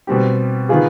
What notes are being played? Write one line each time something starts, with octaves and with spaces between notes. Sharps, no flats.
B2 G3 C4 G4
D#3 B3 F4 G#4